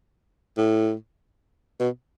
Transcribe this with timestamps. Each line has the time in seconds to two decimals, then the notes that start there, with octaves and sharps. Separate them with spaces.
0.57 A2
1.80 B2